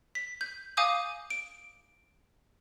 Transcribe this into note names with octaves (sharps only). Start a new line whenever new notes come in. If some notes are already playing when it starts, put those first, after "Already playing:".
B6
G6
F5 G#5 D6 D#6 G6
D7